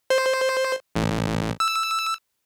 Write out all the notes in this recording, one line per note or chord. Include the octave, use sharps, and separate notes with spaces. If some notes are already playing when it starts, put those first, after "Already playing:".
C5
A1
E6